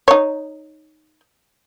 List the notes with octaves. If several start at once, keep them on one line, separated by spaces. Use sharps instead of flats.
D#4 C#5